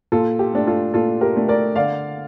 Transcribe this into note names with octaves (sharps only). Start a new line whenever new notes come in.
A#2 F4 A4
G4
A3 D4
F4 A4
A#2 F4 A4
G4 A#4
A3 D4
A#4 D5
D3 D5 F5